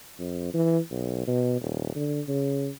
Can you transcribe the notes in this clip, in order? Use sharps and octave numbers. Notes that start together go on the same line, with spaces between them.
F2
E3
B1
B2
D#1
D3
C#3